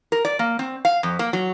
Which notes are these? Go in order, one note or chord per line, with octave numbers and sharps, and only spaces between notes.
A#4
D5
A#3
C4
F5
F2
A#3
F#3